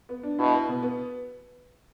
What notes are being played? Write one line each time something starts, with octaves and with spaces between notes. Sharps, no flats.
B3
D4
B2 E4
B4
B2
B3